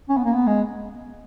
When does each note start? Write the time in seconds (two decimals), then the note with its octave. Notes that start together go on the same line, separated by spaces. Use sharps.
0.09 C#4
0.17 B3
0.25 A#3
0.33 B3
0.47 G#3